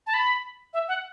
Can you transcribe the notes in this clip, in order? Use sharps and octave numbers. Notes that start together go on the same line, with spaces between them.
A5
B5
E5
F#5